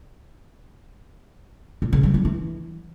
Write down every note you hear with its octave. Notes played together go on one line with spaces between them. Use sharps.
A#2
C#3
G3
F#3
E3